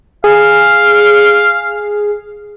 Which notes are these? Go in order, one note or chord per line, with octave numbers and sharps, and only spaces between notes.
G#4 F5